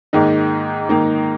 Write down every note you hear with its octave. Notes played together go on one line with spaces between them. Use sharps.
G#2 D#3 A#3 D#4
G#2 D#3 A#3 D#4